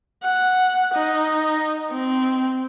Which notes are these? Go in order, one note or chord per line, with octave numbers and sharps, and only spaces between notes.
F#5
D#4
C4